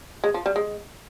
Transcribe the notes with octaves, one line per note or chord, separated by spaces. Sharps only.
G#3
F3
G3
G#3